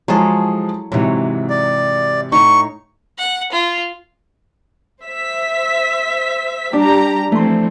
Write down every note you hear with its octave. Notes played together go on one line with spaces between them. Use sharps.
F3 F#3 G#3 E4 G#4 A4
G#2 C3 E3 F#3 C#5
D5
A2 D#4 C#5 C#6
F#5
F4
C5 E5 B6
G3 D4 G4 A#5
E3 F3 A3 C4 C6